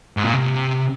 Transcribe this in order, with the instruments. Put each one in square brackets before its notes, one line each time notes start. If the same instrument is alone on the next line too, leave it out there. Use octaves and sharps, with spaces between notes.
[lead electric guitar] G#2
A#2
C3